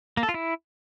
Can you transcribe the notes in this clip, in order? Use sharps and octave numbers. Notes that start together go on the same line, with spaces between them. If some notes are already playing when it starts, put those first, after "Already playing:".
A#3
A4
F4
E4